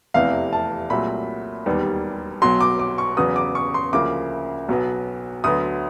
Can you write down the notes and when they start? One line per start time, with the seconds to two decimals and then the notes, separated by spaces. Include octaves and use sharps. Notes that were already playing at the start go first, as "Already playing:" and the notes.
0.14 F1 E2 C3 E3 A3 F5
0.53 A5
0.90 C2 A#2 F#3 A3 B5
1.66 E1 D#2 D#3 G3 B3
2.42 B1 B2 F#3 C6
2.61 D6
2.79 D6
2.98 C#6
3.17 E2 C#3 F#3 B3 D#6
3.36 D6
3.55 C#6
3.74 C6
3.92 D2 C#3 F3 A#3 D6
4.68 B1 B2 F#3 B3
5.44 D2 D3 F#3 B3 D#6